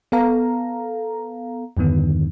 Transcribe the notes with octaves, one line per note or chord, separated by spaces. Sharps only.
B3 A4 F5 A#5
E2 G2 D3 D#3 B3